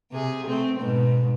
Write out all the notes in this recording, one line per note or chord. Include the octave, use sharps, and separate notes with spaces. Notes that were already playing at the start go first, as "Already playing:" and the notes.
C3 G#4
A3 C4
G#2 B2